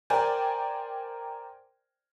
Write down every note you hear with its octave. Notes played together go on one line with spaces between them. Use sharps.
A#4 C5 D5 G5 G#5